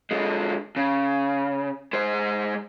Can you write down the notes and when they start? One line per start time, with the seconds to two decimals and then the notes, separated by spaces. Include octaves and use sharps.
0.11 D3 G#3
0.76 C#3
1.93 G#3 C5